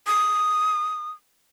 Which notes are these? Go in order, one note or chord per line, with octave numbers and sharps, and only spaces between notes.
D#6